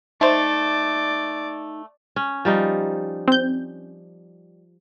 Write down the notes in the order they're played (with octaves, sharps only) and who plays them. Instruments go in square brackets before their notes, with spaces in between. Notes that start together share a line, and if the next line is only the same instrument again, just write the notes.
[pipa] A3 C5 [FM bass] D#4 [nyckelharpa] D5
[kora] C#4
F3 G3 D#4
[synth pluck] C4 G6